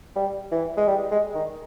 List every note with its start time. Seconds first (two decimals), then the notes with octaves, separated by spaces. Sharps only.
0.16 G3
0.52 E3
0.77 G#3
0.88 G3
1.11 G#3
1.35 D#3